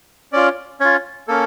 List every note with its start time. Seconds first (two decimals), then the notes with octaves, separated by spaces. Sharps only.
0.32 C#4 F4 D5
0.80 C#4 F4 C#5
1.28 A#3 C#4 A4